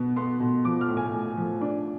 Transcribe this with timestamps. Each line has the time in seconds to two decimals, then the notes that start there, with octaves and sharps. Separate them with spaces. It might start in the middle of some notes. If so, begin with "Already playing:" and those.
Already playing: B2 B3
0.16 B3 C6
0.40 B2
0.65 F3 D6
0.81 F6
0.88 A2
0.97 G#5
1.13 A2
1.37 F3
1.61 D4